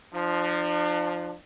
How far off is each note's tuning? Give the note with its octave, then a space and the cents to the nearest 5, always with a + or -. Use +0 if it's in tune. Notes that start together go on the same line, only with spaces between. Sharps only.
F3 +0 D4 +40